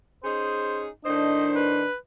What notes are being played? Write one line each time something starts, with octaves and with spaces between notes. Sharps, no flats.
C#4 D#4 G#4 C5
A2 D#3 D4 C5 D#5
B4